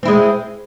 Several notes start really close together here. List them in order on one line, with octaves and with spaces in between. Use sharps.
C4 E4 G#3